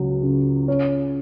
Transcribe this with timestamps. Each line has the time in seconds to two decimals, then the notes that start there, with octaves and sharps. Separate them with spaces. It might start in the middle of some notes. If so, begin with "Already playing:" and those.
Already playing: C#2 F#3
0.23 C#3
0.68 C#4